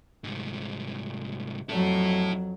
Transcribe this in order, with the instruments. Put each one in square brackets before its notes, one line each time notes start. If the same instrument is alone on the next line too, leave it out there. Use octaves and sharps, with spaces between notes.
[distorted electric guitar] C2 G#2
[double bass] F2 F#3 [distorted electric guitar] E4 A4